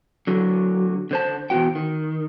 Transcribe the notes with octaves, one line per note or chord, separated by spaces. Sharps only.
D3 F#3
D3 C5 A5
E2 B2 D#3 F#4 G5
D#3